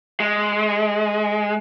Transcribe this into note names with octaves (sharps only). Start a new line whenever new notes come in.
G#3